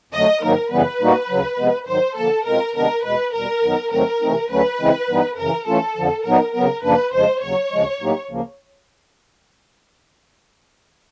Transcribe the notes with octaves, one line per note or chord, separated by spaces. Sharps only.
F2 D3 F#3 A3 D#5
G#2 D#3 F#3 A#3 D#4 A#4
F#2 C#3 E3 G3 B3 B4
A#2 G3 A#3 D#4 F#4
D2 C#3 F#3
C3 F3 G#3 B3
G#2 D#3 F#3 C5
D3 F3 A#3 A4
B2 G#3 C4 F4 A#4
C3 D#3 G#3 B3 D4 A#4
E2 B2 G#3 B4
E2 B2 G3 A#4
F#2 D#3 F#3 B3 D#4
G#2 D#3 F#3 A3 C4 A#4
C3 E3 A3 C4 D#4
D2 D3 F#3 A3 C#4 B4
C#3 E3 G#3 C4 E4
G2 E3 G3 B3 D#4
F#2 C#3 E3 A#4
E3 A3 C#4 F4 A4
F2 D3 F3
A#2 F#3 B3 D#4 A#4
C#3 F#3 B3 A#4
F#2 C#3 F3 A#3 D4 B4
F2 C#3 F3 G#3 C5
D#2 C#3 F#3 C#5
D2 C#3 F3 G#3
A2 F#3 A#3 D#4 G4
D2 C#3 F3 A#3